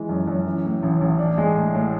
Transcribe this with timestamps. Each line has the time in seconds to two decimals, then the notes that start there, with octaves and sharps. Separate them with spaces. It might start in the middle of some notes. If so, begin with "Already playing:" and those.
Already playing: E3 G#3
0.09 F#2
0.28 F#2
0.46 E3
0.65 A2
0.83 A1
1.01 A1
1.19 D4
1.38 G#3
1.56 A2
1.75 A2